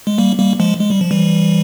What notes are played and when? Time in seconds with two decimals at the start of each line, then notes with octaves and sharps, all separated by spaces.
0.07 G#3
0.18 G3 A#3
0.39 G3 A#3
0.60 F3 G#3
0.80 G#3
0.90 G3
1.01 F3
1.11 E3 G3